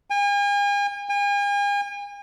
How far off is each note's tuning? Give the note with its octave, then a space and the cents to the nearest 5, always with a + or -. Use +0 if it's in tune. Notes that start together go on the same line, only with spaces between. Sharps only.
G#5 -40
G#5 -40